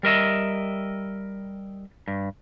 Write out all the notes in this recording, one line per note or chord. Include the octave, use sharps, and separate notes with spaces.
G3 A#4 D#5 E5
G2